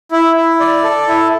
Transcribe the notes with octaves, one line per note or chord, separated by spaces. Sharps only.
E4
E4
D5
A4
E4